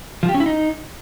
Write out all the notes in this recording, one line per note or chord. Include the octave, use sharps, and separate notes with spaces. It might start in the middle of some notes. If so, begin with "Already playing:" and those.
F3
G4
C#4
E4
D#4